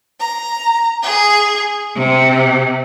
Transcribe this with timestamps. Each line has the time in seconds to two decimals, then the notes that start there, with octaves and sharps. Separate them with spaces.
0.19 A#5
1.01 G#4
1.95 C3